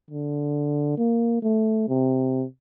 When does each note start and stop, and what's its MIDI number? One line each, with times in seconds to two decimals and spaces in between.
0.11 0.95 50
0.98 1.40 58
1.43 1.86 57
1.89 2.44 48